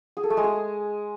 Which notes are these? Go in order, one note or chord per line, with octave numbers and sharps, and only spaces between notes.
G#4
A4
A3
G#3
G#4